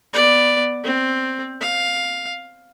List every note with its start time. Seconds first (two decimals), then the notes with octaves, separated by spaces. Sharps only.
0.13 B3 D5
0.84 C4
1.61 F5